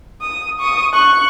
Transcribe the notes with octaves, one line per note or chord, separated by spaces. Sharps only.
D#6
C#6 D#6
C#6 F#6